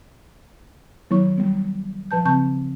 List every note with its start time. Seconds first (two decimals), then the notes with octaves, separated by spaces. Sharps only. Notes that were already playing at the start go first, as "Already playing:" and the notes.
1.11 D#3 F#3 B3 E4 C#5 C#6
1.38 G3 B3
2.11 F3 B4 A5 G6
2.25 C#3 C4 A5 C#6 G6